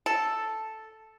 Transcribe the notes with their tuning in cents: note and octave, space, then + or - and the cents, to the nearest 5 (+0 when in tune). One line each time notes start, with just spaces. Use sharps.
A4 +0